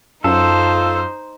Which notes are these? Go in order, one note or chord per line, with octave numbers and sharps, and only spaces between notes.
F#2 D#4 F4 A4 C5